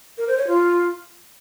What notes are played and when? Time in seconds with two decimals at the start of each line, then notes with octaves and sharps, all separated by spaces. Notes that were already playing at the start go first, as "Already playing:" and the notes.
0.18 A#4
0.28 C5
0.38 C#5
0.48 F4